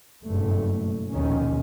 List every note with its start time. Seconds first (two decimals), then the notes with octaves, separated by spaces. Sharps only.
0.23 F#1 G2 B2 A3
1.11 A#1 D#2 B2 D#3 C#4